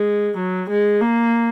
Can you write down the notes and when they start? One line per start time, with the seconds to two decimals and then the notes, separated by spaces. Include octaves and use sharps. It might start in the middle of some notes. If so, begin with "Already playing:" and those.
Already playing: G#3
0.37 F#3
0.70 G#3
1.01 A#3